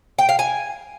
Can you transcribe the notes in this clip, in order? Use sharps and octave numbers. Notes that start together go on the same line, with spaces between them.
G5
F5
G#5